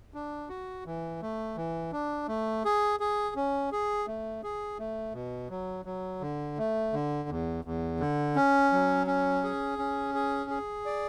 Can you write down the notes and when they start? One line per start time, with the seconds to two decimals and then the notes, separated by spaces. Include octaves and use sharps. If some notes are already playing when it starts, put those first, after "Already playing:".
0.14 D4
0.49 F#4
0.86 E3
1.22 A3
1.57 E3
1.92 D4
2.28 A3
2.65 G#4
3.00 G#4
3.36 C#4
3.72 G#4
4.07 A3
4.44 G#4
4.79 A3
5.14 B2
5.50 F#3
5.85 F#3
6.21 D3
6.58 A3
6.93 D3
7.29 E2
7.65 E2
8.00 D3
8.36 C#4
8.72 F#3
9.07 C#4
9.44 G#4
9.79 C#4
10.15 G#4
10.50 G#4
10.86 D5